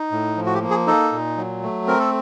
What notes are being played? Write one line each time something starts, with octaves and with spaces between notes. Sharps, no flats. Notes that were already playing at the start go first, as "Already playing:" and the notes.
Already playing: D#4
A2
F3
F#4
G4
A#3
G#4
D#4 A4
A#2
F#3
A3
C4 A#4
A4